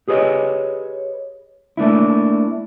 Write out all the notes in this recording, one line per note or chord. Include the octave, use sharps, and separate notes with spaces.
G4 G#4 B4 C#5 D#5
A3 A#3 D4 E4